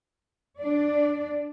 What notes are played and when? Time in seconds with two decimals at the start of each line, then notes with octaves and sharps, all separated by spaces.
0.59 D4 D5